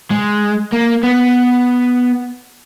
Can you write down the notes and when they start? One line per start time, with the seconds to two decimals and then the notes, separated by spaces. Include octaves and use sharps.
0.11 G#3
0.72 A#3
1.03 B3